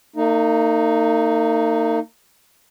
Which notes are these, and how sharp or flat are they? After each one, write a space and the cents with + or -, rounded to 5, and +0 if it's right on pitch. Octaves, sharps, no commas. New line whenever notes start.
A#3 -40 D#4 +0